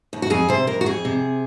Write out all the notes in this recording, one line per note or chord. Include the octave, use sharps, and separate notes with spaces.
D#2
F#4
F2 G#4
C3 C5
F2 A#4
F#4
F2 G#4
C3